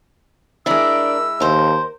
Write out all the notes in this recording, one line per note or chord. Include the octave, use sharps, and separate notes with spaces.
G#3 D4 E4 A#4 D5 E6
D#2 A#4 C5